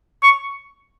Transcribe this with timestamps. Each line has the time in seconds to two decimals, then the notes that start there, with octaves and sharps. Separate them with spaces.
0.23 C#6